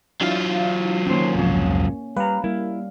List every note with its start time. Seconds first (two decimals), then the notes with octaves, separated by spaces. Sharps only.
0.21 F#3 D4 E4 F4 F5
1.06 D3 D#3 A#3 C#4 C5
1.35 C2 F2 G#2 C#3
2.17 G3 B4 F5 A#5
2.44 G3 A#3 E4